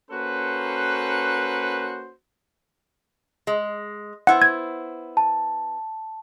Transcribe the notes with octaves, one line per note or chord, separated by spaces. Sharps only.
A#3 C#4 F#4 A4 B4 C5
G#3
B3 E4 C5 F#5
G#6
A5